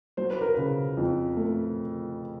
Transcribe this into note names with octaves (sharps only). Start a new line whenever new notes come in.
F#3 C5
B4
A#4
C#3 B4
F2
A3